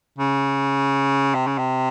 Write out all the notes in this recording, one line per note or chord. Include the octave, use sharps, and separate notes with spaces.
C#3
C3
C#3
C3